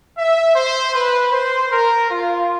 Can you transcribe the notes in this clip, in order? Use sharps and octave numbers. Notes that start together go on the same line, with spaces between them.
E5
C5
B4
C5
A#4
F4